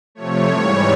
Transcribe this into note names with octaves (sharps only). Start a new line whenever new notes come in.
C3 F3 A3 C#5
G#2 E3 G3 C#5